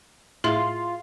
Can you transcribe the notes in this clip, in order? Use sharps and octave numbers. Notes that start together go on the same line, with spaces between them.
A2 F4 G#4 E5